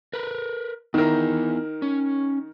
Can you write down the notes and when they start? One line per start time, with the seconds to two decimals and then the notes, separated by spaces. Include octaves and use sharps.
0.13 A#4 B4
0.94 D#3 B3 E4 A#4
1.82 C#4